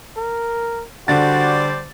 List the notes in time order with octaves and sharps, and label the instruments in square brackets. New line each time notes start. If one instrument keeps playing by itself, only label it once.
[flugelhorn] A#4
[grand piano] D3 A6 [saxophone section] G3 C5 D5 [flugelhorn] F#4